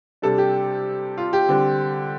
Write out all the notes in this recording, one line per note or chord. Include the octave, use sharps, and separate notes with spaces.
C3 G3 D4 A4
G4
F4
G4
D3 G3 C4